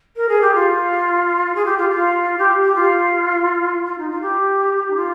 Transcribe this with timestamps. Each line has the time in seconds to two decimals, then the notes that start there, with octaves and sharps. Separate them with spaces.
0.16 A#4
0.28 G#4
0.42 G4
0.54 F4
1.55 G#4
1.65 G4
1.77 F4
1.89 F4
2.38 G4
2.63 G4
2.75 F4
3.85 F4
3.98 D#4
4.09 F4
4.21 G4
4.90 D#4
4.95 F4